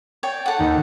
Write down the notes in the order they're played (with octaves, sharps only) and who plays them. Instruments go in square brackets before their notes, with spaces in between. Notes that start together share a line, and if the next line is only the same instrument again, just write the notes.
[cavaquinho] C#5 D5 G5
A4 F#5
[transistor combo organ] D#2 [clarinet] D#4